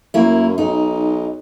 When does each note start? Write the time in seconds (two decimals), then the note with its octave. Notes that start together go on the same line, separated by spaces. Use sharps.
0.14 F#2 A#3 E4
0.58 B1 D#4